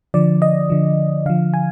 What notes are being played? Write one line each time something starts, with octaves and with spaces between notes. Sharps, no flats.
D3 F3 D5
D#5
D3 F3
D3 F3 F5
G#5